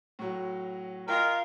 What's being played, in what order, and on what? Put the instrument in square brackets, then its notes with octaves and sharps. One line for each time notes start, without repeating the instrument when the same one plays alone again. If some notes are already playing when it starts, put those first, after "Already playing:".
[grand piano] A2 F#3
[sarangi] F4 [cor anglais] A#4 [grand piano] D#5 G5